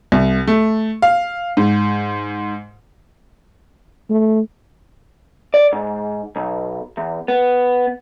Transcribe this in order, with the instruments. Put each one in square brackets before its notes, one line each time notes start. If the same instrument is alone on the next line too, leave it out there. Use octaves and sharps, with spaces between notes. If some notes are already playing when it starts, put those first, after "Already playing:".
[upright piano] C2
A3
F5
G#2
[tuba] A3
[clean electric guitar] D5
G#2
B1
E2
B3